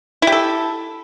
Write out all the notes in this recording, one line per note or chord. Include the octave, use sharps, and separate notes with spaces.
E4 G4 A4